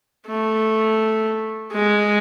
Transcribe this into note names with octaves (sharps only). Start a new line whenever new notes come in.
A3
G#3